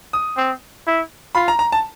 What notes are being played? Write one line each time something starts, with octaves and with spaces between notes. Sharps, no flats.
D#6
C4
E4
F4 B5
A#5
A#5
A5